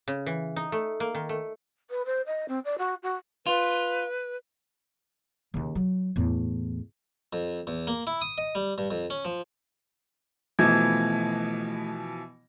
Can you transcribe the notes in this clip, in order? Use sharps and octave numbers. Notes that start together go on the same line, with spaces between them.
C#3
E3
D#4
A3
A#3
D#3
A3
B4
C5
D#5
C4
D5
F#4
F#4
F4 B4
D#2 C#3
F#3
E2 A2
F2
E2
A#3
E4
D#6
D#5
G3
G2
F2
C#4
F3
B2 E3 F3 A3 G#6